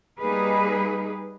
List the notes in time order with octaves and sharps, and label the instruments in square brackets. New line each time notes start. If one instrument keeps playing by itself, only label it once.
[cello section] G3 A#3 D#4 G#4 B4